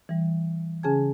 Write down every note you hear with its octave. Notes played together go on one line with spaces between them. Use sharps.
E3 G3
C#3 C#4 G#4 G#5 A5 G#6